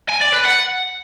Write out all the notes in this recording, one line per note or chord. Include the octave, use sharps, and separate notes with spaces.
G#5
D5
B4
F#5